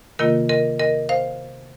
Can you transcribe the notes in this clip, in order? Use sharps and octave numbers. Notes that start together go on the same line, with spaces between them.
C3 D#3 A#3 F4 A#4 D#5
A#4 D#5
A#4 D#5
C5 F5